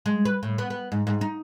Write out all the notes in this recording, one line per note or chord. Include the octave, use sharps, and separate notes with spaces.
G#3
B4
A2
B3
B3
G#2
G#2
D#4